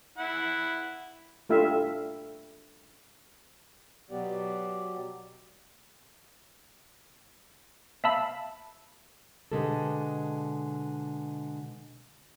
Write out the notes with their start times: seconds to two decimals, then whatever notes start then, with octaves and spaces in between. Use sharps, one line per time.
0.18 E4 F#5
1.49 A3 D4 F4 G4 E5 F5
4.10 B2 F#3 B3 G4 D5
8.04 E5 F5 A5 B5 E6
9.52 B2 D3 F#3 G#3 G4 A4